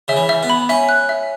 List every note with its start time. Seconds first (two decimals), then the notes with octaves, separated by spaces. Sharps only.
0.08 C#3 E5
0.16 E3
0.29 E5
0.43 B3
0.50 B5
0.69 C#4 E5
0.89 F#6
1.09 E5